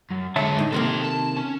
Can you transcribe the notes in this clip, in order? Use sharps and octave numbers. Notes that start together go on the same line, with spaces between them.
F#2
D3 G#3 C#5 E5 A5
A2 D#4
C3 D#3 A#3 A4 C5
A5
C#4